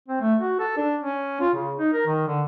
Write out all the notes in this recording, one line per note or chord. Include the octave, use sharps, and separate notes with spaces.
C4
A3
F#4
A4
D4
C#4
F4
C#3
D#4
A#4
D#3
D3